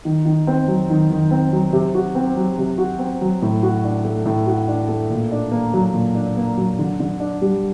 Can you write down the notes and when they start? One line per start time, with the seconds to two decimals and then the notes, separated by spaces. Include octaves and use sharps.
0.05 D#3
0.26 D#3
0.47 C4
0.68 F#3
0.90 D#3
1.10 D#3
1.31 C4
1.52 F#3
1.73 C3
1.95 F#4
2.15 C4
2.37 F#3
2.58 C3
2.78 F#4
2.99 C4
3.21 F#3
3.42 A2
3.63 F#4
3.84 D4
4.05 A3
4.26 A2
4.47 F#4
4.68 D4
4.88 A3
5.10 A#2
5.31 D4
5.52 A#3
5.74 F#3
5.94 A#2
6.15 D4
6.37 A#3
6.57 F#3
6.79 D3
7.00 D3
7.20 D4
7.42 G3